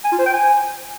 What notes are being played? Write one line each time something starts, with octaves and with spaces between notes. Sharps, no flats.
G#5
F4
C5
G5
G#5